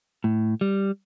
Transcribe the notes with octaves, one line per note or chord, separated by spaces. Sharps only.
A2
G3